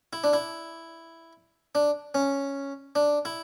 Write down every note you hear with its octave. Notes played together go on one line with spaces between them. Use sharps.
E4
D4
E4
D4
C#4
D4
E4